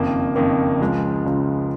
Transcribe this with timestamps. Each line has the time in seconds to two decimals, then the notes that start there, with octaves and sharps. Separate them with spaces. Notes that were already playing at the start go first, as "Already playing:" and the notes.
Already playing: F#1 F2 D#3 A#3
0.36 F#1 F2 D#3 A#3
0.80 C#2 C#3 F3 G#3
1.26 C#2 C#3 F3 G#3